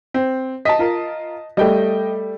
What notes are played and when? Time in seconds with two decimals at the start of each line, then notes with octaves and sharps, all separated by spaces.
0.14 C4
0.65 D#5 A5 B6
0.79 F4 A#4
1.57 G3 A3 D#5 G5